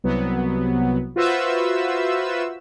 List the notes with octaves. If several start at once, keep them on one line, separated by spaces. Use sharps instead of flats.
C2 F#3 B3
F4 F#4 B4 C5 E5 E6